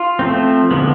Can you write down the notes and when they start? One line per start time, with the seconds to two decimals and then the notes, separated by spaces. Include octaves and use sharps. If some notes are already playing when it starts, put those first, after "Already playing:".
Already playing: F4
0.19 F3 A3 C4
0.71 D3 F3 G#3 B3